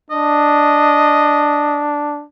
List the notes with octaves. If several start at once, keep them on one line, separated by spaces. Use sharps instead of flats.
D4 D#5